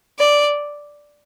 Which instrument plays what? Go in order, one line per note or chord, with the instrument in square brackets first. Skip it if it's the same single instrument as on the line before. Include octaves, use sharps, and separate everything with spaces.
[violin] D5